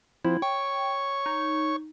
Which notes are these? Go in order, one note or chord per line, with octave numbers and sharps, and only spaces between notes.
F3 C4 E4
C#5 G5 C#6
D#4